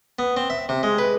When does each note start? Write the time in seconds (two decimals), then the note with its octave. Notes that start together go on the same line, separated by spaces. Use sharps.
0.19 B3
0.37 C4
0.50 E5
0.69 C3
0.83 G#3
0.99 B4